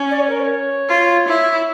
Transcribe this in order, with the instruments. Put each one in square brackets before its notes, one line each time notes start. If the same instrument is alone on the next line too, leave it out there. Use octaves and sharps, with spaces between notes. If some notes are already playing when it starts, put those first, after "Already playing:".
Already playing: [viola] C#4
[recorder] D5
C#5
A#4
C#5
[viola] F4
E4